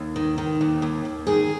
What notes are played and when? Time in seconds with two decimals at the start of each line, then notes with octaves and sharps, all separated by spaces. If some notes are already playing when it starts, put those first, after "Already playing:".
Already playing: D#2
0.16 D#3
0.38 D#3
0.61 D#2
0.82 D#2
1.05 D#2
1.27 D#3 G#4